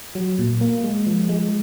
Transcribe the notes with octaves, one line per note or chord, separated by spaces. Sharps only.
F#3
A#2
A#3
G#3
F3
G#3